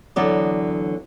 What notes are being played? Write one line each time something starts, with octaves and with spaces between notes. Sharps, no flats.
E2 D3 F#3 B3 D5